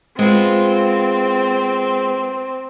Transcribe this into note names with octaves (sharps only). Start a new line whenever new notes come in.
G#3 B3 C4 F4